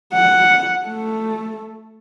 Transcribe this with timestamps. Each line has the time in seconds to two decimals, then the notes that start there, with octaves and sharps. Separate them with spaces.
0.13 F#5
0.87 A3